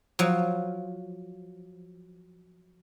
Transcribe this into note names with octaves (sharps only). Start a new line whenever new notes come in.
F3 F#3